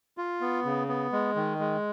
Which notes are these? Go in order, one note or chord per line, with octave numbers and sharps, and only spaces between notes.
F4
B3
C#3
B3
G#3
D#3
G#3